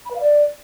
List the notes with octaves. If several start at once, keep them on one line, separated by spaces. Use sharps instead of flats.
B5
B4
F5
D5